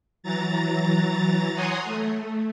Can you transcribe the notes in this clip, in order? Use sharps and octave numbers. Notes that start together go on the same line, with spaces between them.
E3 F#3 A#5 A6
C#5 F#5 G#5 A#5 C6 D#6
A3